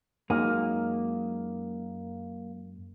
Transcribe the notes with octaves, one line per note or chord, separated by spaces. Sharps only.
F#2 G#3 A#3 D#4